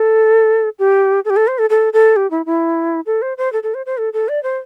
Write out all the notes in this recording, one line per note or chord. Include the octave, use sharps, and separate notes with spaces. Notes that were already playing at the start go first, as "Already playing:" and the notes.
Already playing: A4
G4
A4
G4
A4
C5
A4
A4
A4
G4
E4
E4
A4
C5
C5
A4
A4
C5
C5
A4
A4
D5
C5